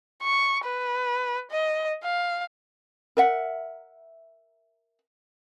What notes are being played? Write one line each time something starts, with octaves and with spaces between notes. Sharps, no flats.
C#6
B4
D#5
F5
A#4 E5 F#5